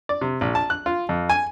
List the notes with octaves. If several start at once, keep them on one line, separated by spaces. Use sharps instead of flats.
D5
C3
A#1
A5
F#6
F4
F2
G#5